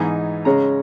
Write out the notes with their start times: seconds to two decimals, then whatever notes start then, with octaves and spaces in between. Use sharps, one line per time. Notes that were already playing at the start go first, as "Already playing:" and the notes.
Already playing: G#2 E3 B3 D#4 G#5
0.45 C#3 G#3 C#4 A#5